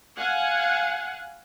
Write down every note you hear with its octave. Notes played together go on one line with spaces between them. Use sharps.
F5 F#5 G#5